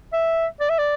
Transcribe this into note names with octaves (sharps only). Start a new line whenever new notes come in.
E5
D5
E5
D5